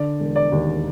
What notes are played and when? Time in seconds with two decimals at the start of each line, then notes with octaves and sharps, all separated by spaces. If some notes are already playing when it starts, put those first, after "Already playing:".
Already playing: D3 D5
0.20 E1
0.36 D5
0.52 D#2